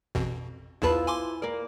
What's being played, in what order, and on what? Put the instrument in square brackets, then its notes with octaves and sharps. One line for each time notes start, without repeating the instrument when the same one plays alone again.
[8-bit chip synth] A1 F2 B2
[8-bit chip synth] B1 E2 A5 [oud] E4 F4 B4
[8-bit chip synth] G#5 C6 D6
[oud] A#3 D5